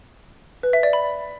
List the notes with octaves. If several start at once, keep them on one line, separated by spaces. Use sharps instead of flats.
B4
E5
D5
B5